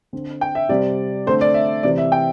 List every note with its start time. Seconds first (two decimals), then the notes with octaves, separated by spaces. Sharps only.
0.13 D3 C4
0.41 G5
0.55 E5
0.69 C3 G3 C4 D5
1.27 D3 A3 C4 C5
1.41 D5
1.54 E5
1.83 C3 E3 C4 D5
1.98 E5
2.12 G5